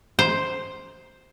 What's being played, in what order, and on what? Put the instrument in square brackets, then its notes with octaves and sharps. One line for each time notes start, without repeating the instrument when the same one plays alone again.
[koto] C5